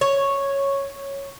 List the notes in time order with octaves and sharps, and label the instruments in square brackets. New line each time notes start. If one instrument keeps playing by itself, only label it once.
[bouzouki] C#5